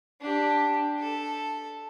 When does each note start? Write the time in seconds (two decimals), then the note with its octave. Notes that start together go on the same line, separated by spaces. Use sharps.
0.21 D4 G4
0.99 A4